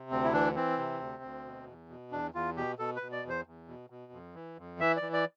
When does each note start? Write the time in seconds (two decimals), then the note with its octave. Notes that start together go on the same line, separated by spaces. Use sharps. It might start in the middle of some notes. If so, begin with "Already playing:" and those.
Already playing: C3
0.10 D2 C4
0.24 E4
0.33 E3 D4
0.55 E3 C4
0.78 C3
1.00 D2
1.23 D2
1.45 B2
1.67 E2
1.89 B2
2.12 E2 D4
2.34 E2 F4
2.56 B2 G4
2.79 B2 A4
2.96 B4
3.01 B2
3.12 D5
3.24 E2
3.29 C5
3.46 E2
3.68 B2
3.90 B2
4.12 F2
4.35 E3
4.58 F2
4.80 E3 E5
4.96 D5
5.02 E3
5.13 D5